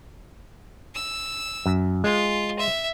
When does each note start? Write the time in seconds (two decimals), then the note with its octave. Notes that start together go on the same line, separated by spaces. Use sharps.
0.95 E6
1.66 F#2
2.04 G#3 F4
2.59 E5